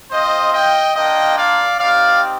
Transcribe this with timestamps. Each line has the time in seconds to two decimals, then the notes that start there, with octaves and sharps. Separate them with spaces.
0.11 C4 F4 C5 D#5
0.53 D#5 G5
0.95 A#3 D4 F4 D#5 G5
1.37 D5 F5
1.78 C4 D#4 G4 D5 F5